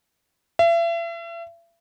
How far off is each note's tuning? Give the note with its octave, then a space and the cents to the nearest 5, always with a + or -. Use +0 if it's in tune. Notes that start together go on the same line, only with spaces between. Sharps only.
E5 +40